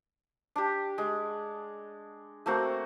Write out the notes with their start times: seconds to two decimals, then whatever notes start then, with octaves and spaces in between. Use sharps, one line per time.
0.56 D4 G4
0.98 G#3
2.46 A3 A#3 C4 F#4